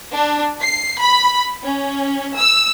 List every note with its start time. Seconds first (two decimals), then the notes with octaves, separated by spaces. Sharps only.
0.13 D4
0.60 C7
1.00 B5
1.64 C#4
2.38 E6